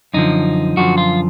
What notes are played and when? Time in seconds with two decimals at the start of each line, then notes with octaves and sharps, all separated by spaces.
0.14 F#2 D3 F3 D#4
0.77 F#2 D3 F3 F#4
0.98 F4